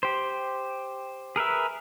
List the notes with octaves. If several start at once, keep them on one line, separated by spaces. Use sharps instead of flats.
G4 C5
G#4 A#4 B4 E5